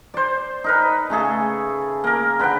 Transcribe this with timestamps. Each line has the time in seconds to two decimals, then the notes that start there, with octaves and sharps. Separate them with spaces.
0.14 C5 D5
0.64 D#4 A#4 B4
1.10 C#3 A3 G#4 A4
2.04 A#3 A#4
2.39 D3 B4 F#5 G5